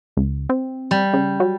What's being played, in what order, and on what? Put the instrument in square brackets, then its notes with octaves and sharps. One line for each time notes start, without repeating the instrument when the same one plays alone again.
[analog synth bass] C#2
C4
[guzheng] G3
[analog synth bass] C#3
F#3